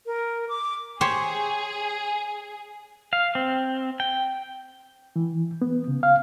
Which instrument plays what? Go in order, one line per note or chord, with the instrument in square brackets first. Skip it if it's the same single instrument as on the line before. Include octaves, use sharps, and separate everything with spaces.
[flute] A#4
D6
[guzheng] G4 C5 C#5 [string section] G#4
[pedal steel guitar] F5
C4
G5
[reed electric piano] E3
B3
C#3
F5